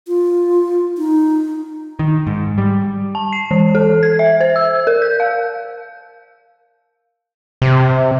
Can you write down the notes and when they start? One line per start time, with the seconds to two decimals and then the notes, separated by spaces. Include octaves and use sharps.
0.08 F4
0.98 D#4
1.99 D#3
2.27 G#2
2.58 G3
3.15 A5
3.33 C7
3.51 E3
3.75 A4
4.03 G#6
4.19 E5
4.41 C5
4.56 E6
4.87 A#4
5.02 G6
5.20 F5
7.62 C3